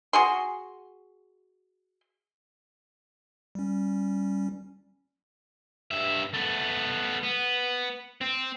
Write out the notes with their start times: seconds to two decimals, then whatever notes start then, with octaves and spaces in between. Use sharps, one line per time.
0.13 F#4 G#4 C6
3.55 G3 C#4
5.91 G2 E5
6.34 A3 B3
7.24 B3
8.21 C4